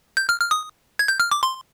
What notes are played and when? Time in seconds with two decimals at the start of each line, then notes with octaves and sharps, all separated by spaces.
0.17 G6
0.29 F6
0.40 F6
0.51 D#6
0.99 G#6
1.08 G6
1.20 F6
1.31 D6
1.43 C6